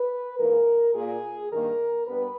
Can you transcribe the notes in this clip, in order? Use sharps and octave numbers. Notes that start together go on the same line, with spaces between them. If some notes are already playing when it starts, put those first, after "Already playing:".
Already playing: B4
G#2 E3 A#3 A#4
A#2 A#3 G#4
G2 D#3 A#3 A#4
G2 G3 B3 B4